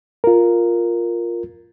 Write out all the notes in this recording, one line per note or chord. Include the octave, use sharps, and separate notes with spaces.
F4 A#4